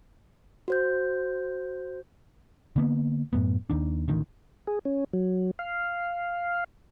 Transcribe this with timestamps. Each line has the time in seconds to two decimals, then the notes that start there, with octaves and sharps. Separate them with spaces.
0.68 F#4 C5 G6
2.76 D3 A#3 B3
3.33 F#2 A2 B3
3.70 D#2 D#3 D4
4.08 A1 D2 D#3
4.67 G#4
4.85 C#4
5.13 F#3
5.59 F5